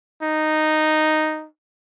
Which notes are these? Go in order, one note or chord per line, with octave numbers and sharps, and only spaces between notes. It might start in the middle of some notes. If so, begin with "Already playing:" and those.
D#4